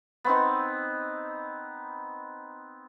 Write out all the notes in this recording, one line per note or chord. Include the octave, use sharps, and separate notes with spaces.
B3 C4 D#4